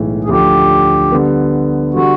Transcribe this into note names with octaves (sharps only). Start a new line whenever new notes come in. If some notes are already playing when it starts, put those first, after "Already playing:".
Already playing: B1 A2 E3 G#3
G#4
D2 D3 F3 G4
D3 G3 B3
D3 G3 F#4